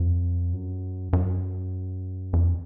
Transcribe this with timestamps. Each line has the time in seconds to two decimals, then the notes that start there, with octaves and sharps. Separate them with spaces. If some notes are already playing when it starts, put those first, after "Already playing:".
Already playing: F2
0.53 F#2
1.13 F#2
2.33 F2